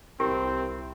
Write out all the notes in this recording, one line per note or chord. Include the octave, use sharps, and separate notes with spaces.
C2 C4 E4 G4 A#4